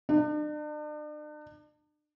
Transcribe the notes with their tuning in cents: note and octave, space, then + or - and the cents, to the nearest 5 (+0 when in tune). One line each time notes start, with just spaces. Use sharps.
D4 +40